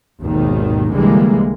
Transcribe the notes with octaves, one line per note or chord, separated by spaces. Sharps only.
G#1 D#2 G#2 B2 D#3
C2 D3 E3 G3 G#3 A#3